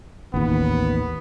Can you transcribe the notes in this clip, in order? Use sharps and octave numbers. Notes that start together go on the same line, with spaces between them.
A1 D#2 B3